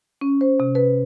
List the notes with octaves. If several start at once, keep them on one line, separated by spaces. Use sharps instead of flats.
C#4
C5
C3
B4